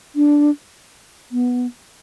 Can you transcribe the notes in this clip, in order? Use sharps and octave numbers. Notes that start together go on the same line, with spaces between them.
D4
B3